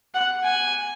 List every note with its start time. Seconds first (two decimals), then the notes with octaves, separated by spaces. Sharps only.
0.14 F#5
0.44 G#5